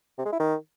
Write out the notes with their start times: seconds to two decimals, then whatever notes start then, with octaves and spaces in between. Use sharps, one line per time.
0.18 C3
0.25 G#3
0.32 E4
0.39 D#3